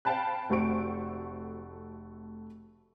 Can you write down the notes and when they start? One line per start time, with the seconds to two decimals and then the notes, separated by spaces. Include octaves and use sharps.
0.05 C5 F5 G5 A5 B5 F#6
0.49 F1 A3 F#4 C5 C#6 D7